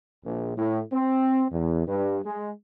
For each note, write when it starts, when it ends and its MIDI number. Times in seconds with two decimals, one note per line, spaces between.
0.24 0.54 34
0.56 0.80 45
0.92 1.45 60
1.51 1.87 40
1.87 2.18 43
2.25 2.50 56